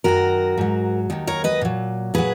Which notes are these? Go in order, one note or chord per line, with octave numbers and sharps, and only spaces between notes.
F#2 D#3 F#3 F#4 A#4
G#2 F#3
D#2 D#3 F#3
A#4 C#5
B4 D#5
A#2 F#3
A#2 F#3 G#4 B4